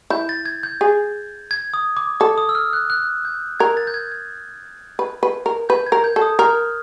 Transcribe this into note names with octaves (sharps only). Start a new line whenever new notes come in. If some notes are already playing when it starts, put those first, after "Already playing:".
E4 G6
A6
G#6
G6
G#4
G#6
D#6
D6
A4 D6
D#6
E6
F6
F#6
F#6
G6
A#4 G#6
A6
G6
G#6
G#6
B4
B4
A#4
B4 G6
G#6
A#4
G6
A4
D#6
A#4 F6